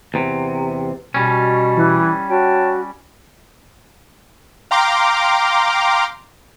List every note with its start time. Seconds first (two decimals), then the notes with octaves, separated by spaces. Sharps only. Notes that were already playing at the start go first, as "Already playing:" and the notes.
0.14 E2 C3
1.14 B2 G3 C#4
1.76 E3
2.30 F#4 C#5 G5 A5
4.71 F5 G5 A#5 C6 D6